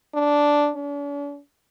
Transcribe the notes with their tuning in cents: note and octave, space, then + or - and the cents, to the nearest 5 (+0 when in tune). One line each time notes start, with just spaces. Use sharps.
D4 -5
D4 -45